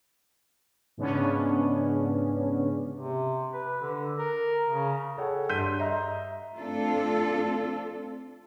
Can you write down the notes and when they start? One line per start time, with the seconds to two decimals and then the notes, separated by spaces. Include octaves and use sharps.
0.98 G#2 C#3 B3 C#4 D4
2.95 C3
3.53 B4
3.82 D3
4.19 A#4
4.69 C#3
5.17 G#4 A4 C#5 F#5 G5
5.49 G2 C6 G6 B6 D#7
5.79 D#5 E5 A#5 C6
6.55 A3 C4 D4 F4 A4